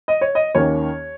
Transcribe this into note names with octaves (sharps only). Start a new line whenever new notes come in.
D#5
C#5
D#5
D#2 D#3 A#3 C#4 C#5